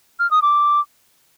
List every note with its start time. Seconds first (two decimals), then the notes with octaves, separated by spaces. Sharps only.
0.19 F6
0.31 D#6
0.42 D6